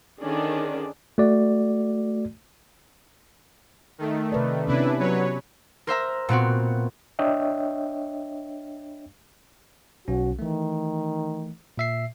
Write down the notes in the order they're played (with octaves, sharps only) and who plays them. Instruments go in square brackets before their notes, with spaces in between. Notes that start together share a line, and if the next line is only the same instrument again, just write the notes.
[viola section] D3 D#3 C#4 D4 G#4 D5
[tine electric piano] A3 F#4 D5
[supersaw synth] D#3 A3
[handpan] C3 B4 D5
[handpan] C3 B3 C#4 [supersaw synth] D4 E4 B4
[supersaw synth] F#3 B4 C#5
[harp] A#4 C5 E5 A#5
A#2 B3 C4 F#4
[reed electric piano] D4 C#5 D#5 E5 G5
[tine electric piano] B1 C#4 [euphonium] F#4
[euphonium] D#3 [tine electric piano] E3 A3
[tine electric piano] A#2 E5 C7